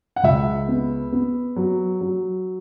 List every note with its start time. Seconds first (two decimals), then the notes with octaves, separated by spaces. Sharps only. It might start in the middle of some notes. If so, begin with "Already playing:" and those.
0.16 F#5
0.23 C#2 E5
0.68 B3
1.12 B3
1.56 F#3
2.01 F#3